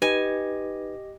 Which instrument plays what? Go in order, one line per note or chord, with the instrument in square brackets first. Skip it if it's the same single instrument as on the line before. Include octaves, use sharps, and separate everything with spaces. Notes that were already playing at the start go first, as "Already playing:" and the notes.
[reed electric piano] D#4 B4 [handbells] G4 D#5 [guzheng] G#5